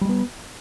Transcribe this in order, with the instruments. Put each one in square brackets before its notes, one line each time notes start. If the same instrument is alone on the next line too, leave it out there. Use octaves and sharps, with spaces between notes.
[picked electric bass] G3
G#3
B3